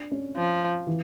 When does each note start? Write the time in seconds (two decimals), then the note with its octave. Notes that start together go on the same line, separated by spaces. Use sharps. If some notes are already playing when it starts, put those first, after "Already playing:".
Already playing: D4
0.12 C#4
0.36 F3
0.87 E3